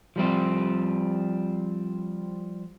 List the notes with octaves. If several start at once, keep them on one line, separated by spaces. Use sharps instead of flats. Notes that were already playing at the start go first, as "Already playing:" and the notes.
F3 G3 C4